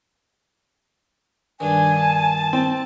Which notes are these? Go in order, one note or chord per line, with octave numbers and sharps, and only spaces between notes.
G2 D#3 D4 G#5
A5
C4